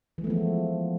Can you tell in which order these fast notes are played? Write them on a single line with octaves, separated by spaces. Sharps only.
E3 G#3 A3 B3 F3